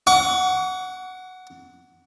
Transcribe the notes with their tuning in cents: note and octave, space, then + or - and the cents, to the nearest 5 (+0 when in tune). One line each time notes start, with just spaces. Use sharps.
F#5 +0 C#6 +45